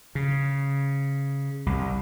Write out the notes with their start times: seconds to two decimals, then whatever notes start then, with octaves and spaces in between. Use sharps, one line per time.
0.15 C#3
1.66 C2